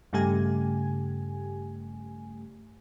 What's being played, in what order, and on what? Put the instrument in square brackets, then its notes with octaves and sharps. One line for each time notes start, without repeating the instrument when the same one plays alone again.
[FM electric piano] G2 C#3 A3 G4 G#5